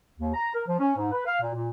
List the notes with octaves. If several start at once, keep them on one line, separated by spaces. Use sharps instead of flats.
D#2
A#5
A#4
F3
C#4
G#2
B4
F5
A#2
A#2